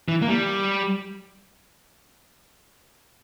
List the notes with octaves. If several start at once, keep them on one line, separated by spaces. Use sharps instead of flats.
E3
A#3
G3